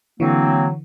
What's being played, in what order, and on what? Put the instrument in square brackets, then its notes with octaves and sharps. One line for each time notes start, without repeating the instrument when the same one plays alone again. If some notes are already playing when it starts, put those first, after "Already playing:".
[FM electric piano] D3 E3 [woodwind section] F#3 A#3 C4